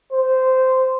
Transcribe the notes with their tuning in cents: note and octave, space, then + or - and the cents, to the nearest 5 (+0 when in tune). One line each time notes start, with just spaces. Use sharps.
C5 -10